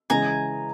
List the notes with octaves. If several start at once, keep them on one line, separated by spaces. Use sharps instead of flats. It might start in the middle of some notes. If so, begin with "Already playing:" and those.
C#3 E3 G#3 G#5 A#5